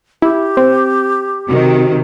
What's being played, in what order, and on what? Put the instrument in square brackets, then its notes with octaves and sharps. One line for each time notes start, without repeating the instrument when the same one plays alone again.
[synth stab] E4 [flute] G4
[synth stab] C4
[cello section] C3 D#3 [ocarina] F#4